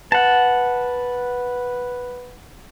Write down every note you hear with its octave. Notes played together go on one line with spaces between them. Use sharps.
B4 F#5 A5